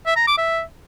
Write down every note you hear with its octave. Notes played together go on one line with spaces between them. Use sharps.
E5
A#5
D6
E5